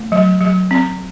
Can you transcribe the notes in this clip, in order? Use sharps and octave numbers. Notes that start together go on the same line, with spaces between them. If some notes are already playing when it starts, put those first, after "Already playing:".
Already playing: A3
F#3
F#3
C4